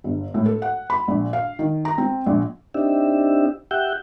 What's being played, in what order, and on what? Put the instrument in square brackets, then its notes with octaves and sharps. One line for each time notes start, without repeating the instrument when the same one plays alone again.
[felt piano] G1
A2
A4
F#5
B5
A#1
F5
D#3
A#5
C4
A#1
[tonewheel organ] C4 D4 D#4 G4 E5
G4 E5 F#5 G6